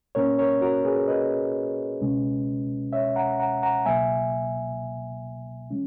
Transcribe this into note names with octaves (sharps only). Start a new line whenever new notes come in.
A#2 A#3 C#4 A#4 C#5
A#4 C#5
F#4 A#4
G#4 B4
B4 D#5
C#2 B2 G#3 C#4
C#5 E5
F#5 A#5
F#5 A#5
F#5 A#5
C#2 B2 F#3 A#3 E5 G#5
E3 G#3 C#4